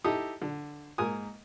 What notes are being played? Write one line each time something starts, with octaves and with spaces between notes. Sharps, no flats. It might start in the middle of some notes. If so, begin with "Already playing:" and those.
D#4 E4 G4 A4 D#5 D#6
D3
G#2 A#3 A#4 G#5 D#6